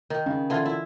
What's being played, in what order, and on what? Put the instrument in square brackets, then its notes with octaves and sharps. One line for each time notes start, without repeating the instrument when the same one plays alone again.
[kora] D#3
[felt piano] C#3
[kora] D3 E3 F4
E4